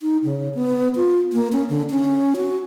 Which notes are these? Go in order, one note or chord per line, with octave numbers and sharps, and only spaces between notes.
D#4
C#3
B3
F4
A#3
C#4
D3
C#4
F#4